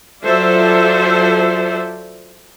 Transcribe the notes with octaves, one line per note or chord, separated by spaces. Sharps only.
F#3 F4 A4 C5 D5 E5